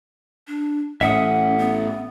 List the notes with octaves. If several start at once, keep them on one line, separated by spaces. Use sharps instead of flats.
D4
A1 A2 C#4 E5 F#5 D#6
B3